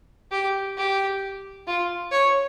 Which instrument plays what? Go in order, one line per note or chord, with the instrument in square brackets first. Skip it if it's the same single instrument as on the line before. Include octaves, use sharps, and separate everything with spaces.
[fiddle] G4
G4
F4
C#5